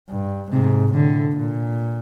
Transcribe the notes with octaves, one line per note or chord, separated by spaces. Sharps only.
G2
G#2 C3
A2 D3
A#2